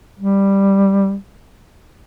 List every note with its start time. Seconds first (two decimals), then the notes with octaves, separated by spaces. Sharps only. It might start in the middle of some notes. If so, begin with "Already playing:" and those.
0.19 G3